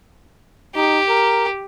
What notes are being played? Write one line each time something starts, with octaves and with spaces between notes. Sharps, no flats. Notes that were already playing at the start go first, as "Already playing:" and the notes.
D#4 G4
A#4